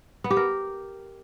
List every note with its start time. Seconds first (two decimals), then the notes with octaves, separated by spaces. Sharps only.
0.24 B3
0.31 G4
0.37 A#4